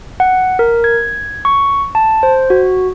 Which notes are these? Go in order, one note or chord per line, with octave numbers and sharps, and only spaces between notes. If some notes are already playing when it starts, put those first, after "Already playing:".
F#5
A#4
G#6
C#6
A5
C5
F#4